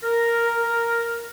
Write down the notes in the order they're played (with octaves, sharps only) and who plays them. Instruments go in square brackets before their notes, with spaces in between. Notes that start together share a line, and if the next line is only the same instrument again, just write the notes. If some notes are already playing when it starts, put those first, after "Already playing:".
[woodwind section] A#4